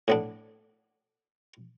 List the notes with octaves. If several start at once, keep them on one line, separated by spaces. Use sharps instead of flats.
A2 B3 D4